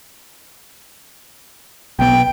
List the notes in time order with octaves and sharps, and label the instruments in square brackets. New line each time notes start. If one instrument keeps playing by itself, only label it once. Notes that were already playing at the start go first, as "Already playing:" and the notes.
[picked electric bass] B1 B3 [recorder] G5